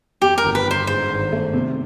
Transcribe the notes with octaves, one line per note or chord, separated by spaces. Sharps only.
F2 G4
A#4
G1
B4
G1
C5
G#2 C5
G#1
A3
C3